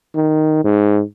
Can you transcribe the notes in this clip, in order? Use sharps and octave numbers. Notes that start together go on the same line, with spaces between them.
D#3
G#2